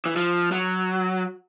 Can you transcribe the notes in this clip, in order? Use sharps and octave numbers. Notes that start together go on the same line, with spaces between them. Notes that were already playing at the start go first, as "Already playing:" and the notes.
E3
F3
F#3